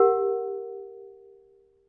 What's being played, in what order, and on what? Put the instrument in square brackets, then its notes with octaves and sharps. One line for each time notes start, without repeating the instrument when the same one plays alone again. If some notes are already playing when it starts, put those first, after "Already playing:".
Already playing: [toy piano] G4 A#4 F#5